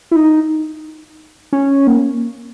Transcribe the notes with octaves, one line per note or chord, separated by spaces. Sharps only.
E4
D#4
C#4
A#3